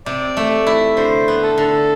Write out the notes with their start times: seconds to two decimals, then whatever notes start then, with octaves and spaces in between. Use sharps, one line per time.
0.06 C3 D5
0.37 A3
0.67 E4
0.97 D3 C5
1.28 B3
1.43 A4
1.58 D3